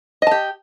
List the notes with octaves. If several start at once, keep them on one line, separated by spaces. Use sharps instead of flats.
G4 D#5 A5